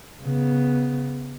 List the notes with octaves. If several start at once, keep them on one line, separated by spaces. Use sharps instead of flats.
C#3 B3